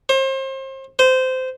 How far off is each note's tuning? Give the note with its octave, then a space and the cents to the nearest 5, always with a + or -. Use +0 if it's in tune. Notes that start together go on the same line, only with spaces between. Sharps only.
C5 +35
C5 -20